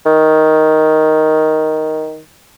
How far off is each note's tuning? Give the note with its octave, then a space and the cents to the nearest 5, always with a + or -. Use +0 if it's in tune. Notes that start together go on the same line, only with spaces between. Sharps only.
D#3 +5